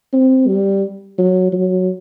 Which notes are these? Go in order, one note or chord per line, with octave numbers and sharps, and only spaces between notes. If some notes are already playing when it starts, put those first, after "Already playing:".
C4
G3
F#3
F#3